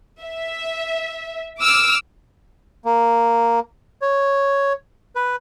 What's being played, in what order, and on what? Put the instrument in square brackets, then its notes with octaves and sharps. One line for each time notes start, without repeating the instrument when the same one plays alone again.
[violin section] E5
D6 E6 F6
[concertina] A#3
C#5
B4